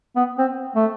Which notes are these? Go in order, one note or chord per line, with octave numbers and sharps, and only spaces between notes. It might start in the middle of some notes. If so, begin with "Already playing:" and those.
B3
C4
A3